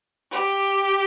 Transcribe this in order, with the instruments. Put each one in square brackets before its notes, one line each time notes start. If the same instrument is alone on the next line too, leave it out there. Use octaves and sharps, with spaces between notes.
[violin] G4